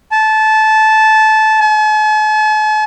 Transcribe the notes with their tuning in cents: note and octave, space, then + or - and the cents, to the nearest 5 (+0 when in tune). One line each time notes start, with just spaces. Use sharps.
A5 -15
A5 -45